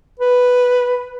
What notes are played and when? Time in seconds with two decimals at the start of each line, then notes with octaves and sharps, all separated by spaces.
0.19 B4